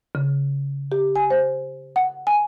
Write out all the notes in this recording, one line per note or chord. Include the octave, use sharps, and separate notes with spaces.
C#3
G4
G#5
C5
F#5
G#5